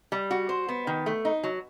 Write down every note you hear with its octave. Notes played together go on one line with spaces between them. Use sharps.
G3
F#4
C5
B3
D#3
A3
D#4
F#3